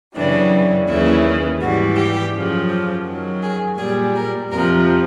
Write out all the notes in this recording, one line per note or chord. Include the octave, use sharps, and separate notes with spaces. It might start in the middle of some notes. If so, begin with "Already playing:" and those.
F#2 C#3 E3 G3 D4
D#2 C#3 E3 E4
G#2 E3 G3 F#4
G4
F#2 C#3 F3
G4
F#2 D#3 F#3
G#4
A#2 G3 G#4
A#4
F2 C3 F3 A#4